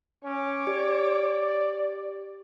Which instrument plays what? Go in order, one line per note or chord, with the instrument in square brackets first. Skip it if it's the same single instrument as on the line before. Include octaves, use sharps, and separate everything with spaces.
[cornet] C#4 [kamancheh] C#5 D6
[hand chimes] G4 [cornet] D5